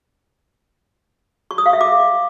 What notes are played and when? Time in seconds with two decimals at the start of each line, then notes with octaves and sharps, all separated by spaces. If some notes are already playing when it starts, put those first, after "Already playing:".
1.51 C#6
1.58 D#6
1.66 F5
1.73 E5
1.81 D6